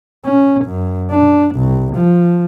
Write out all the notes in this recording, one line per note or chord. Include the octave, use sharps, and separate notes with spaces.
C#4
F#2
D4
C2
F3